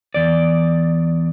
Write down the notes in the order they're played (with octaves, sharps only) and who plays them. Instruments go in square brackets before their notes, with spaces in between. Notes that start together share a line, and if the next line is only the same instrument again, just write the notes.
[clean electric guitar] E2 D5